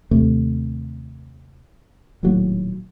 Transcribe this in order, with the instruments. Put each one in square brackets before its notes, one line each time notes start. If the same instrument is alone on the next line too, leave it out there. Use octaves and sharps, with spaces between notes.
[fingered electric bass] D#2 C3 A3
D#1 D#2 A2 F#3